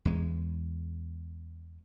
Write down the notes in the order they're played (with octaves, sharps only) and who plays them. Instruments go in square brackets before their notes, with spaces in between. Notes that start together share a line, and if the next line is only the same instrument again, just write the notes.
[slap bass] E2 G#3